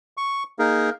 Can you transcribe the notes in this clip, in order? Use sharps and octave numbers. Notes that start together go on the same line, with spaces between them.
C#6
A#3 D#4 G#4 A#4